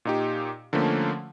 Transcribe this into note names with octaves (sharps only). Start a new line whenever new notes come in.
A#2 D#4 G4
D3 F3 A3 A#3 C#4